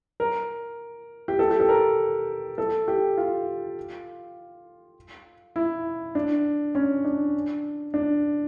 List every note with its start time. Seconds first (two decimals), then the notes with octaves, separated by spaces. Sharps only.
0.20 A#4
1.28 G4
1.39 A4
1.51 G4
1.60 A4
1.69 A#4
2.58 A4
2.88 G4
3.18 F4
5.56 E4
6.15 D4
6.75 C#4
7.05 D4
7.94 D4